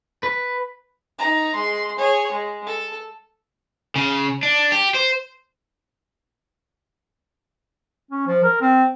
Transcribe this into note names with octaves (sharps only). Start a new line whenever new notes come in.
B4
D#4 A#5
G#3 C6
G#4 C#5
G#3
A4
C#3
D4
G4
C5
C#4
F3
A#4
C4